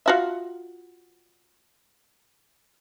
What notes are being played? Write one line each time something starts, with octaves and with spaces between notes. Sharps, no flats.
F4 F#4 E5